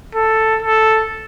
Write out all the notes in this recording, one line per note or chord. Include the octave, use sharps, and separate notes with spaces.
A4
A4